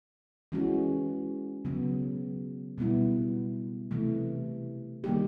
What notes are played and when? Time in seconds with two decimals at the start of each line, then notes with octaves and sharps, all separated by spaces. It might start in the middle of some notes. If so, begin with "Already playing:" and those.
0.52 E3 G#3 C#4 F#4
1.65 C#3 F#3 B3
2.78 B2 G3 B3 E4
3.91 C3 E3 A3
5.04 D#3 G3 A#3 D#4 G4